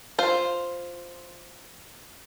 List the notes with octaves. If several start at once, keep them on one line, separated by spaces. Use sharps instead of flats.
F4 C5